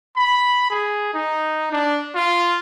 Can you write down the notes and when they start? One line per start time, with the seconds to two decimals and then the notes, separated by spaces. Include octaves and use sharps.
0.16 B5
0.70 G#4
1.14 D#4
1.72 D4
2.15 F4